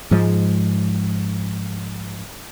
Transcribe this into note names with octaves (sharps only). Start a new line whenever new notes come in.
G#2 F3 G#3